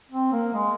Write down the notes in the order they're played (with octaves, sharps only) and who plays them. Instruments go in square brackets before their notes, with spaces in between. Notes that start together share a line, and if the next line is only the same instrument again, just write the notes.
[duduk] C4
A#3
G#3